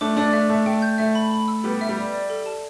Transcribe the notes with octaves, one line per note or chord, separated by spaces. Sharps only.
A3 D4 D6
A3 D4 D5
A3 E5
A3 E5
A3 G5
G6
A3 E5
B5
B5
E6
G3 B3 A4
E5
G3
D5
D5
A4
A5